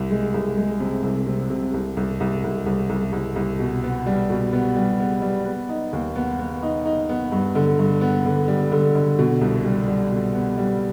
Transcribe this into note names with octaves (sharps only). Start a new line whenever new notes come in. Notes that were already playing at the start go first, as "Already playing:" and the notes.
Already playing: C2
G#3
C2
G#3
C3
C2
C3
C3
C2
C2
C2
C2
C2
C2
C2
C2
B2
B3
G3
B2
B3
G3
B3
G3
B3
D#4
D#2
B3
B3
D#4
D#4
B3
G2
D3
G2
B3
D3
G3
D3
D3
B2
C2
G3
G3
B2
B3
G3